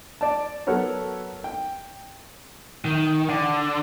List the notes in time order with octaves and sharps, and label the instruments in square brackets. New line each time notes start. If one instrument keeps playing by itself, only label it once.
[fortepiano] D5 A5
F#3 B3 A4 A#4 C#5
G5
[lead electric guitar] D#3
D3